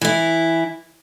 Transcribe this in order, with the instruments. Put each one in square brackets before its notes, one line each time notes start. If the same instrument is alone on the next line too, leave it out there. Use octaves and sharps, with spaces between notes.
[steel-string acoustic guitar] E3 E4